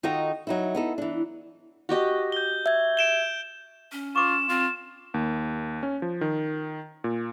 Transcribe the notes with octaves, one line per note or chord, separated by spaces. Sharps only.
D#3 D#4 F4 F#4 A4 D#5
F#3 D#4 E4
B3 D#4 A4
E3 D4
F#4 G4 D#5
G6 G7
E5 G#6
D7 E7 G7
C#4
F4 C#6 D6 E7
C4 F4
D#2
C#4
F3
D#3
A#2